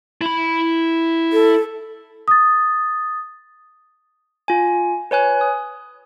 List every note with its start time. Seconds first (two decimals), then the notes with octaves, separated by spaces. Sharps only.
0.21 E4 B5
1.33 A4
2.28 D#6 A6
4.48 F4 G#5
5.11 B4 C#5 G#5 F#6
5.41 D#6